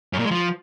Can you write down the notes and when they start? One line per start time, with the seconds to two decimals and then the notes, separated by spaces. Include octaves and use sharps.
0.13 F#2
0.19 A#2
0.25 G#3
0.31 F3